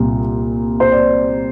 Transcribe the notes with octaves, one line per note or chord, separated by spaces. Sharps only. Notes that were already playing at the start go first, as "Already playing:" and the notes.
Already playing: C2 A#2 G3
C5
D5